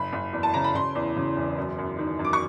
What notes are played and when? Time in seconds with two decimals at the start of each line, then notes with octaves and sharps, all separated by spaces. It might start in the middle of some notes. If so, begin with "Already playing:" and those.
Already playing: F#1 B5
0.13 F#1
0.33 E2
0.43 A5
0.54 C#3 A#5
0.64 B5
0.74 C#3 C6
0.95 E2
1.17 C#3
1.36 E1
1.57 F#2
1.78 F#2
1.98 D#3
2.19 F#2
2.24 D6
2.33 C#6